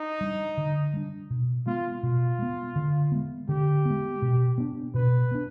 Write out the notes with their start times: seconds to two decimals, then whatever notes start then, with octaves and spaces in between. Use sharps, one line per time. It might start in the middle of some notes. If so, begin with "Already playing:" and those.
Already playing: D#4
0.21 G3 D4
0.57 D3
0.93 G3 D4
1.30 B2
1.66 G#3 B3 F4
2.03 B2 F4
2.39 G#3 B3
2.76 D3
3.12 G#3 B3
3.49 D3 G4
3.85 G#3 B3
4.22 B2
4.58 B3 D4
4.94 B2 B4
5.31 B3 D4